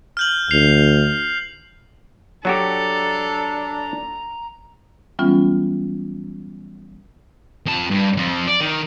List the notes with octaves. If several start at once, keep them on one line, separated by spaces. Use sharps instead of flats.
F6 G6 F#7
D2 C7 F7
F#3 D4 F#4 G4 A4 A#5
E3 F#3 G3 B3 C#4 F4
F2 A5
G2
F2 F3
D5
D#3